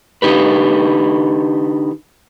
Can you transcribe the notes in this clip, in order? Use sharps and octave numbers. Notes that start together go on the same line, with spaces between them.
D3 D#4 G4 B4